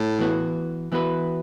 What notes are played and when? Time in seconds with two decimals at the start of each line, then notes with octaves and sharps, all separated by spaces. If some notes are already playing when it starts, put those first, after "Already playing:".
Already playing: A2
0.19 E3 B3 F#4
0.92 E3 B3 F#4 B4